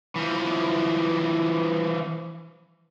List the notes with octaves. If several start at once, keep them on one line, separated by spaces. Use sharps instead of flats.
E3 F3